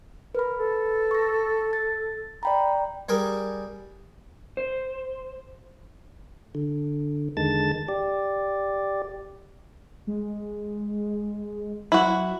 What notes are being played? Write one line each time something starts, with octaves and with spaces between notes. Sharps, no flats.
A#4 B4 B5
A4
C#6 A#6
A6
D5 G5 A#5 B5
G3 G4 G#4 A#4
C5
D3
E2 D3 D#3 G#3 A5 A6
G4 D5
G#3
F#3 E4 F#4